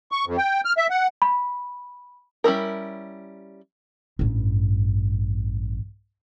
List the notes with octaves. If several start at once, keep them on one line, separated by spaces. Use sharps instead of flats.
C#6
F2
G5
F6
E5
F#5
B5
G3 C#4 E4 A#4
A1 G2